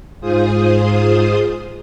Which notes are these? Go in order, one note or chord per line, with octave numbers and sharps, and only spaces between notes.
G#2 F4 G#4 C5 D#6